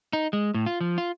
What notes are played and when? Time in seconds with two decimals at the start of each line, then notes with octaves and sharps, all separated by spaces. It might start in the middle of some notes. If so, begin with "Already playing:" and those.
0.13 D#4
0.33 G#3
0.54 A2
0.66 F4
0.81 F3
0.98 F4